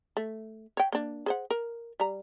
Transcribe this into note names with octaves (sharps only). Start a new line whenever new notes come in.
A3
C#5 G5
A#3 D4
G#4 C5 F#5
A#4
G3 A#5